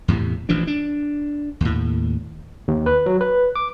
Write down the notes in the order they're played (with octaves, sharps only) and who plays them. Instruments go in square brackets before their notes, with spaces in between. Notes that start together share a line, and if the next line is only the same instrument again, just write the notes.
[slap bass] E2 A2 C3
A1 E3 F3 D4
D4
D#2 A2
[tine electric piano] D#2
B4
F#3
B4
D6